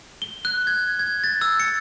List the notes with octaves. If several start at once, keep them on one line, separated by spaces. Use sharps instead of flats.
G7
F#6
G#6
G#6
A6
E6
C#7